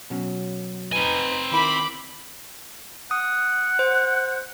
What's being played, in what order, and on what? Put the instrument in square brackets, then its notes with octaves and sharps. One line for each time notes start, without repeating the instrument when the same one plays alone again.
[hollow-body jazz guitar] B2 F#3 C#4
[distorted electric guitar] C4 G#5 [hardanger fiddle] D#4 B4
[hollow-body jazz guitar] D#3 E4 A#4 [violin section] B5 [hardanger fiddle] D6
[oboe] F#5 [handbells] D#6
[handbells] C5